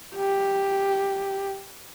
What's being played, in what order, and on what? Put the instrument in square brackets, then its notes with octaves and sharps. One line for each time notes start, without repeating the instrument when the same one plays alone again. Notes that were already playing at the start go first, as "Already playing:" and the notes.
[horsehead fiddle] G4